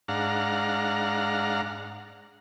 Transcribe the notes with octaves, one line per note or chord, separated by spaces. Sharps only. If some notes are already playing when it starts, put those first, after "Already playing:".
G#2 D4 F5 F#5 A#5